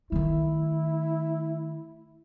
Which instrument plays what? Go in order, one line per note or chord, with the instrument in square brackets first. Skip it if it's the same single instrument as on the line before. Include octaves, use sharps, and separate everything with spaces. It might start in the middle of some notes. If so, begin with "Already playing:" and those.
[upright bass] D#3 A3 [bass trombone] E4